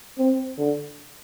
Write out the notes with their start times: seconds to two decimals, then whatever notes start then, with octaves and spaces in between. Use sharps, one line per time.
0.18 C4
0.58 D3